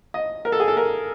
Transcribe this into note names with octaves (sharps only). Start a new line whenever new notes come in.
D#5
A#4
A4
G#4
A4
A#4